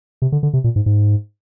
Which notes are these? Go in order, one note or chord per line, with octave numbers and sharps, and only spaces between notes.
C3
D3
D3
C3
A#2
G#2
G#2